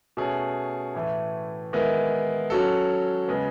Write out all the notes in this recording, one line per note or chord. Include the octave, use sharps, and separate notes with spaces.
B2 A3 C#4 G#4
A2 E3 A3
D#3 G#3 B3 E4
F#3 C#4 F#4 A4
C#3 G#3 B3